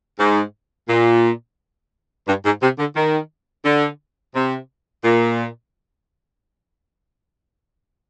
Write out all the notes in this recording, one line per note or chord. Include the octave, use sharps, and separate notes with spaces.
G#2
A#2
G2
G#2
C3
D3
D#3
D3
C3
A#2